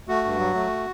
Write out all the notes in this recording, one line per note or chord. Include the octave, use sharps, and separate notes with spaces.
A3 F#4
G2
F#3
A3